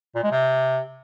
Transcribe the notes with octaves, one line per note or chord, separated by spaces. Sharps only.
A#2
G#3
C3